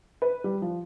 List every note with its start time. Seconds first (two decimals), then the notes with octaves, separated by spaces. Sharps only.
0.22 B4
0.44 G3
0.62 F3